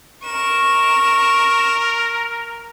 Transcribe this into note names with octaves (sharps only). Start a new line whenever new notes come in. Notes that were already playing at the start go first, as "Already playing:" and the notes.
A#4 C#6 E7